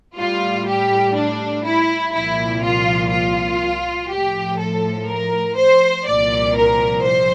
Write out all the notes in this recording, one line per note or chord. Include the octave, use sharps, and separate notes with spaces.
A2 G3 F4
G4
D4
E4
C2 A#2 F3 E4
F4
F4
A2 F3 G4
A4
A#4
C5
C2 A#2 F3 D5
A#4
C5